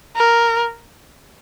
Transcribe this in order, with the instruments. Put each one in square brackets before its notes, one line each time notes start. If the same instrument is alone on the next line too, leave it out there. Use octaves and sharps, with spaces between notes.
[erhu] A#4